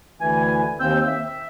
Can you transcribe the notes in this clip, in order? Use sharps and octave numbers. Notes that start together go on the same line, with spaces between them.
D2 E3 G#5
D#2 C4 E6 G6
E5